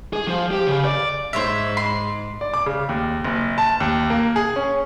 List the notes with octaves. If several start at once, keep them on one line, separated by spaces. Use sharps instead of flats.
G#4
F3
G4
C#3
D5
G#2 C5 C#5 E5
C6
D5
D6
C#3
D#2
F#1
A5
D#2
A#3
G#4
C#4